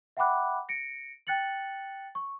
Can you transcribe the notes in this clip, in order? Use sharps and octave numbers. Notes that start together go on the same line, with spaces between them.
E5 F#5 G5 B5 D6 F#6
A#6 C#7 D7
G5 F#6 A6 C#7 F#7
C#6